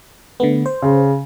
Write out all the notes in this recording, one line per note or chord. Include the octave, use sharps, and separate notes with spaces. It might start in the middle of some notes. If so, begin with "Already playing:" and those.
D3 A3 B3
C5
C#3